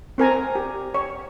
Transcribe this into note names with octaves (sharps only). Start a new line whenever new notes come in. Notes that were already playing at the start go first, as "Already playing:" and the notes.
C4 A#4 G#5 A#5
G4
C#5